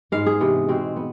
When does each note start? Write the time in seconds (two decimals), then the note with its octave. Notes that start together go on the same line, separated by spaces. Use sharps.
0.12 G#2 G#3 B3 F5
0.26 G#4
0.40 C3 E3 B3
0.68 B2 G#3 C4
0.96 B3